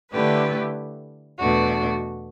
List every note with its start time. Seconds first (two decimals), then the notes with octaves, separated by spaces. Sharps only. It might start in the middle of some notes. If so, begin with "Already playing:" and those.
0.11 D3 A3 E4 G4 B4
1.39 E2 B2 A3 D4 F#4